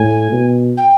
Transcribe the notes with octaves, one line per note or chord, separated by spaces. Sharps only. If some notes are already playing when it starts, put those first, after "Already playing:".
Already playing: A2 G#5
B2
G5